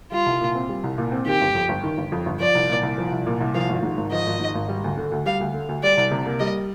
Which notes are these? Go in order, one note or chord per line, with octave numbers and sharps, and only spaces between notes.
G3 F4
C2
A#2
C4
G3
C2
A#2
C4
D#3 G4
G1
F2
G1
D#3
G1
F2
G1
F3 D5
C2
A#2
C2
F3
C2
A#2
C2
F3 F5
G#1
G#2
G#1
F3 D#5
G#1
G#2
G#1
G3
D2
D3
D2
G3 F5
D2
D3
D2
G3 D5
C2
C3
A#3
G3 D#5